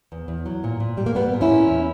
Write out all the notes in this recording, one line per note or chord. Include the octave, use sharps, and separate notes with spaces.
E2
E2
F#3
A#2
A#2
G3
A#3
G3 B3
A#2
C#4 E4
A#2
E2